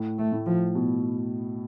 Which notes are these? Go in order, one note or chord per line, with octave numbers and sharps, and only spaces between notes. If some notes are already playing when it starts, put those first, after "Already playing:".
Already playing: A2
A3
A2
F3
B2